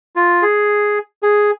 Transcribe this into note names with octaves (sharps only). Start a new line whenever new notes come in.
F4
G#4
G#4